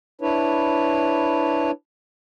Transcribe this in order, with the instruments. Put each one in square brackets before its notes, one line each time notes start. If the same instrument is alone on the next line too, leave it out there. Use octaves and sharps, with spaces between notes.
[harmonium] D4 E4 B4 C#5